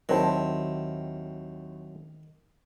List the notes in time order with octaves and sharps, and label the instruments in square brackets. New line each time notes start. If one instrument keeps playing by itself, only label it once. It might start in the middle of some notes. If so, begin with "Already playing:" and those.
[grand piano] D#2 C5 A5 [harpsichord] D#3 [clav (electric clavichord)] F#3 C4 E4